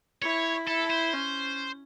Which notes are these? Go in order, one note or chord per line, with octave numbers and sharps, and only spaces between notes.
E4 C#5
E4 A4
C5
C#4